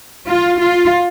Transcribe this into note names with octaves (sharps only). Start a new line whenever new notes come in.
F4
F4